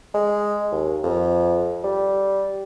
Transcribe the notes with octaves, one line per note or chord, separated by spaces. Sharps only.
G#3
D#2
F2
G3